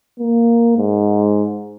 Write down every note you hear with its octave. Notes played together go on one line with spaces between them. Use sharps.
A#3
G#2